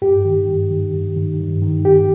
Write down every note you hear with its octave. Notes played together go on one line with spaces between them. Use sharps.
G2 G4
D#3
G2
D#3
G2
D#3
G2
D#3
G2 G4